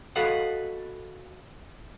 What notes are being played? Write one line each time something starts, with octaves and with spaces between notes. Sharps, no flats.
F#4 A4 B4 D#5 F5 F#5